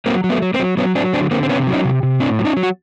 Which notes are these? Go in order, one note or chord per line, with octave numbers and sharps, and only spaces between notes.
F#3 A#3 C4
F#3
A3 B3
F#3
A#3 C4
F#3
F#3 B3 C#4
F#3 C4 D4
D3 C4 D4
D3 A#3 C4
C4
C3 B3 C#4
F#3
C#4 D#4
C3
C3
A2 C4 D4
F#3
C#4 D#4
F#3
F#4